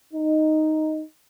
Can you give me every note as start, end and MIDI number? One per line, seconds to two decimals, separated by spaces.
0.14 1.02 63